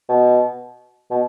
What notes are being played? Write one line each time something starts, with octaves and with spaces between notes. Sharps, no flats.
B2
B2